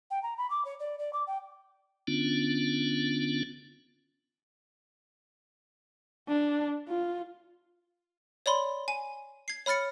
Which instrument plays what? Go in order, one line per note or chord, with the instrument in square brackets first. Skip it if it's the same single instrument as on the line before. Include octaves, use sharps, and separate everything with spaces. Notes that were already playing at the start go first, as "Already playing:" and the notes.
[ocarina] G5
A#5
B5
D6
C#5
D5
D5
D6
G5
[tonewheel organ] D3 B3 C#4 D4 F4
[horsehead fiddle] D4
F4
[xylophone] C#5 D5 B5 C6
G#5
G#6 C7
C#5 B5 F6 A6 C#7